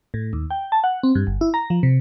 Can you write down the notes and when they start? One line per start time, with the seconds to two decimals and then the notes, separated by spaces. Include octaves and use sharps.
0.14 A2
0.33 D#2
0.50 G5
0.72 A5
0.84 F#5
1.03 C4
1.15 G2
1.27 G1
1.41 E4
1.54 A#5
1.70 F3
1.83 C3